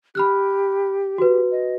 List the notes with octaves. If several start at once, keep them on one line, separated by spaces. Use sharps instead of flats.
G4 B5 F6 F#6
F#4 B4
D#5